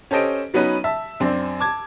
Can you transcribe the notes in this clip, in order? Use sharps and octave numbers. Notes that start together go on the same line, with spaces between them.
C#4 G4 A4 C5 D#5 D7
F#3 B3 C#4 D#4 B4
E5 A5 E6
F#2 C4 D4
A5 D6 G#6